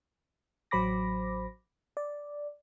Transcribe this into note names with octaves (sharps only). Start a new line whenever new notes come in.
A1 F#3 C5 B5 D6 A#6
D5